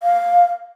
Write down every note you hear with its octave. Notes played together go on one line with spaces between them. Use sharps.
F5